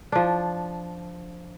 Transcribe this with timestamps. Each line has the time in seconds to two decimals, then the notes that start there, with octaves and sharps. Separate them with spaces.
0.12 F3 D4